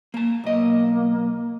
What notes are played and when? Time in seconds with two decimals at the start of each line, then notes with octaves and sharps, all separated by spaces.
0.14 A#3 A5
0.44 B1 A#3 D#5